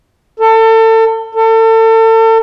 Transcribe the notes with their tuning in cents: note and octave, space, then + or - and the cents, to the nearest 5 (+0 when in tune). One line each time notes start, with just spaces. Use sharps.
A4 +30
A4 +35